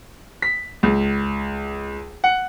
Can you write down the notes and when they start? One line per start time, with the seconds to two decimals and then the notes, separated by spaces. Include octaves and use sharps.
0.42 B6
0.83 C#2
2.24 F#5